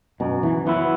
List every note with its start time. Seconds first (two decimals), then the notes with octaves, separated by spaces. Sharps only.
0.20 F#2 B2
0.43 E3
0.66 E3 F#3 B3 E4